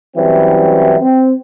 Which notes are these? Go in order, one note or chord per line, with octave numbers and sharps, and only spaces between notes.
E3 F#3 G3 C4 C#4 E4
C4